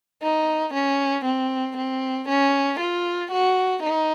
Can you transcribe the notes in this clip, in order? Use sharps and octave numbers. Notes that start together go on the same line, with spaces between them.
D#4
C#4
C4
C4
C#4
F4
F#4
D#4